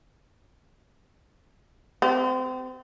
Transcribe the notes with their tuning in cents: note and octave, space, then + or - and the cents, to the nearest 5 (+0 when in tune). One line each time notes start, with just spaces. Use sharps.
C4 -30